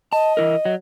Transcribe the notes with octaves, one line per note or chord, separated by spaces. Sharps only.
D#5 A5
E3 E4 A#4
F#3